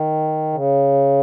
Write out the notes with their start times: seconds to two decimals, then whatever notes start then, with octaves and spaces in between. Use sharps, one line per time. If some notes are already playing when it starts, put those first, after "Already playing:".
Already playing: D#3
0.53 C#3